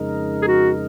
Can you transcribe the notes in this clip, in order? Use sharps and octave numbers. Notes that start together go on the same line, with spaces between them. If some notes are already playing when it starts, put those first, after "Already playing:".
Already playing: F2 C#3 G#3 D#4 A#4
G#4
F#4